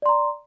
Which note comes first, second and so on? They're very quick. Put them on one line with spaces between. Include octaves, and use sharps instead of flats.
D5 C6 A#5